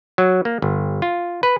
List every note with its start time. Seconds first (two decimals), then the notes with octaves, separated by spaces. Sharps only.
0.18 F#3
0.45 A#3
0.62 G1
1.02 F4
1.43 B4